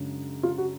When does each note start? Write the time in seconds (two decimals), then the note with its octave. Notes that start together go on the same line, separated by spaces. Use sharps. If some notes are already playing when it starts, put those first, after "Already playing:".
Already playing: F#2 C#3 G#3 D4
0.43 F4
0.58 F#4